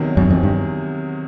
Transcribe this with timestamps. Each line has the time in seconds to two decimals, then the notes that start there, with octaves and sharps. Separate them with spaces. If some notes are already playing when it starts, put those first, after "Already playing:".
Already playing: E2 C3 D#3 F#3
0.17 F#2
0.30 F2
0.43 G2